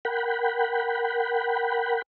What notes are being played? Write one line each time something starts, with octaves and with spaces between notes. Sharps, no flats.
A#4 F#5 G5 B5